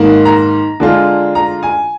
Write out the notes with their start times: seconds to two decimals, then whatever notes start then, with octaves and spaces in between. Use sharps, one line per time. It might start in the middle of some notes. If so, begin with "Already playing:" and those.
Already playing: G#2 D#3 A#3
0.25 A#5
0.80 D3 G#3 D4 F4
1.35 A#5
1.63 G#5